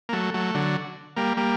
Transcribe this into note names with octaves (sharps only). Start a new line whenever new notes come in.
A#3
F#3 A3
F#3 A3
D3 F#3
G3 A#3
G3 A#3